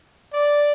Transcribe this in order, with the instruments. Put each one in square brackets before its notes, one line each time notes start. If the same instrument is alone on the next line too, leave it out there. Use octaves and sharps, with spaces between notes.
[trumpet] D5